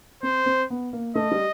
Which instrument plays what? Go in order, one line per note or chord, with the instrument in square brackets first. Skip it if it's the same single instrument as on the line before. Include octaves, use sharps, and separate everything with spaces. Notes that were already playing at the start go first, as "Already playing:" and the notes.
[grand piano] C4 [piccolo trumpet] C5
[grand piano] C4
B3
A#3
[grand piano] A3 [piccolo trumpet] D#5
[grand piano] G3